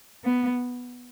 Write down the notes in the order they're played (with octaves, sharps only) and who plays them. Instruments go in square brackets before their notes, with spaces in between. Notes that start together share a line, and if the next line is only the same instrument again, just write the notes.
[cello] B3